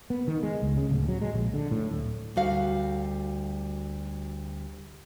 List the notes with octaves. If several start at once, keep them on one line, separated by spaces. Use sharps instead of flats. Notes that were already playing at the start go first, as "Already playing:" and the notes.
B3
D#3
G#3
C#2
C#3
D1
F#3
G#3
A#1
D3
A2
D1
D2 G3 F#4 F5